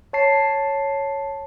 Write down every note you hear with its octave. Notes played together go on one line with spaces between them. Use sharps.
C#5 A5 C7